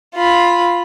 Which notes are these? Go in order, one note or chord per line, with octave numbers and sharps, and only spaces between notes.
F4 B5